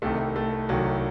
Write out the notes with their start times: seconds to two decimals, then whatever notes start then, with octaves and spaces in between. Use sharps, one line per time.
0.02 C2 C3 D#3 A3
0.36 A3
0.69 C2 C3 D#3 F#3